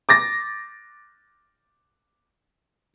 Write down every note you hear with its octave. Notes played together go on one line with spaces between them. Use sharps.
D6 A6 A#6